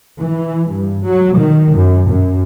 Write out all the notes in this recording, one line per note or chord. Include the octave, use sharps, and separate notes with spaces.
E3
G2
F#3
D#3
F#2
F#2